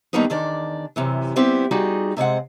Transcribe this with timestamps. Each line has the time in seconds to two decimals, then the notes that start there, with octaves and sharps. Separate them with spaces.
0.13 G2 D#3 G3 A#3 B3 D#4
0.30 E2 D#3 D4 D5
0.96 F#2 C3 E3
1.36 G3 B3 C4 E4 G4
1.71 G3 D#4 F4 F#4 G#4
2.17 C3 G#3 C4 F#5